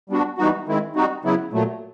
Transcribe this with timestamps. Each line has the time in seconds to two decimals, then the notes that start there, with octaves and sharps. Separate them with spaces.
0.09 G3 B3 D4 F#4
0.38 E3 G3 B3 D#4 F#4
0.67 D#3 G#3 C4 E4
0.96 G3 C4 D#4 F#4
1.24 C#3 F#3 B3 E4
1.53 A#2 F#3 A3